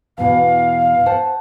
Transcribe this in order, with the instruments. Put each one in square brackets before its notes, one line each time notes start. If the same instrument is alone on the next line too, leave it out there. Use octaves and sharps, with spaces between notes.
[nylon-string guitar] E2 B2 E3 [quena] F5
[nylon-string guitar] C5 F#5 A5